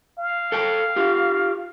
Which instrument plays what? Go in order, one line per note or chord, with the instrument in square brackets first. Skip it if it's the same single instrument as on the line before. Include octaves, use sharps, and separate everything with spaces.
[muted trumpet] F5
[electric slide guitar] A4 G5 A5
F4 G4